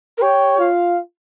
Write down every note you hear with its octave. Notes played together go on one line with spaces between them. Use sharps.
A#4
G4 C#5 G5
F4 F5